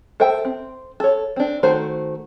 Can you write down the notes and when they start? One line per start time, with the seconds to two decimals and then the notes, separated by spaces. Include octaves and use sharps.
0.20 A4 C5 E5 G5 A5
0.45 C4
1.00 A4 C#5
1.36 C4 D4
1.63 D#3 A3 F#4 C5